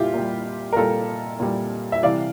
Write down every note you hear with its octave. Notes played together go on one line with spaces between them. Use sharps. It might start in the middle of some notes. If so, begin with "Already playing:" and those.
Already playing: A#2 G3 E4 F4 G4
A#2 G3
A#4
A#2 G3 F4 A4
A#2 G3
E5
C3 E3 G3 D5 F5